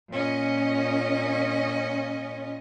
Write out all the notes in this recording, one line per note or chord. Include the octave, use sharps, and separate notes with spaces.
A#2 C#4 D#5